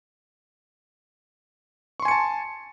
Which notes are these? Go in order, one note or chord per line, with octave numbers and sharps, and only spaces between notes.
G#5 A5 C6 C#6 C#7